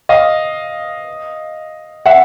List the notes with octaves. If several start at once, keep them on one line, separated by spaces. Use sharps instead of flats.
D#5 F5
E5 F#5